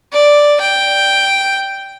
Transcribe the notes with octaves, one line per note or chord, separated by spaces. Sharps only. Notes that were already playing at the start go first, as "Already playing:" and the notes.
D5
G5